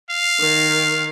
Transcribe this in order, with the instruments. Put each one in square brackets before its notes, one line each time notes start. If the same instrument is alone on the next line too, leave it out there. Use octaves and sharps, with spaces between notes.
[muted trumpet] F5
[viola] D#3